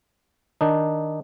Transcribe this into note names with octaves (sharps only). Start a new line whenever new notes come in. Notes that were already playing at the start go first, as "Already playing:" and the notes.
D#3 D4 D#4